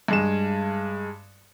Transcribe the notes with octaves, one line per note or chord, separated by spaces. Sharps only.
G2 G#3 E7